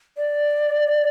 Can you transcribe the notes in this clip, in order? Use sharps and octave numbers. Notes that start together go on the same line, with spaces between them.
D5